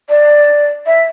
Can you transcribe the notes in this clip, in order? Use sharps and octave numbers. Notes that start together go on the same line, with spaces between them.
D5
E5